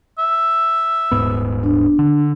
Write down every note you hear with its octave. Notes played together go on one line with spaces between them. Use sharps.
E5
D#1 G#2 B3
D4
D3